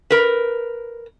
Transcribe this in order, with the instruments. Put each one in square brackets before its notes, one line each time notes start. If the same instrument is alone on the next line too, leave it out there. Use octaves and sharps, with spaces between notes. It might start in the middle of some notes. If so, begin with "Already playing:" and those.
[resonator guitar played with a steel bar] A#4 B4